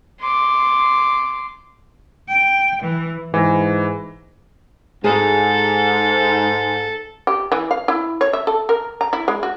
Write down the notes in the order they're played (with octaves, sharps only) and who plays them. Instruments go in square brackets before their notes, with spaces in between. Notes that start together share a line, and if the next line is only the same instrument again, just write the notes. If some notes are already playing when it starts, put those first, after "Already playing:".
[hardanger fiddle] C6 D6
[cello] G5
E3
[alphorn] G#2 [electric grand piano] E3 A#6
[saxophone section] G#2 [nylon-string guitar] F#4 G#4 [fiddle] A4
[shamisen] G4
E3
F5
E4
C#5
E5
A4
A#4
A#5
E4
G#3
F#4